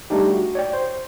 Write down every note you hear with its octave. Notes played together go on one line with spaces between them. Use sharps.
G3 A3 D4 D#4 G4
F#4
C#5 D5 G5
C5